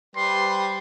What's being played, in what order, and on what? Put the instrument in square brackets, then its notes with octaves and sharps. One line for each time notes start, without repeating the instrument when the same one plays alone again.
[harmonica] G3 B4 C5 [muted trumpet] C6